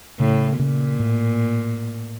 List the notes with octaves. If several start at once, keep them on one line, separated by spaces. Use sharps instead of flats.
A2 C#3
A#2 C#3
A2